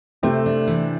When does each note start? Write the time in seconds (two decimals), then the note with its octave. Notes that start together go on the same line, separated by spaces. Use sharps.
0.23 C3 A3 C4
0.46 D4
0.68 E3